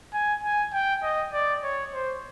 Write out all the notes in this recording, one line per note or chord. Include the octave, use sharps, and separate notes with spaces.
G#5
G#5
G5
D#5
D5
C#5
C5